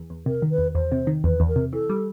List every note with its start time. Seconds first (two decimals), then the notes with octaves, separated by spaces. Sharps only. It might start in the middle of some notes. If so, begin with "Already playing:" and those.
Already playing: E2
0.10 E2
0.26 C3 A#4
0.42 D#3
0.51 B4
0.58 E2
0.74 E2 C5
0.92 C3
1.07 D#3
1.24 E2 B4
1.40 E2
1.48 A#4
1.56 C3
1.73 E3 A4
1.90 G3